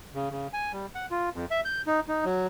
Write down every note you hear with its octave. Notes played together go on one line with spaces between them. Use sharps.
C#3
C#3
G#5
G3
F#5
F4
F2
E5
G6
D#4
D#4
F#3